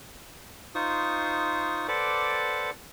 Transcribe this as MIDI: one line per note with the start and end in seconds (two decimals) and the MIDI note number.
0.75 1.87 63
0.75 1.87 65
0.75 1.87 72
0.75 1.87 85
0.75 1.87 87
1.88 2.70 69
1.88 2.70 71
1.88 2.70 72
1.88 2.70 74
1.88 2.70 78
1.88 2.70 86